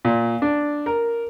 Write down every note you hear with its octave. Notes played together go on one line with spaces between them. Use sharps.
A#2
D4
A#4